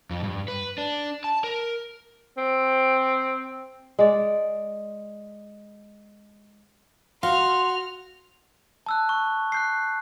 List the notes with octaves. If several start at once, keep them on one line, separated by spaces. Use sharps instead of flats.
F2
G2
B4
D4
A5
A#4
C4
G#3 D5
F#4 F5 C6 F6
A5 E6 F#6
C#6
F#6 G6 C7